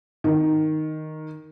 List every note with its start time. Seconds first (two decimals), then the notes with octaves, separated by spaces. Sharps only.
0.24 D#3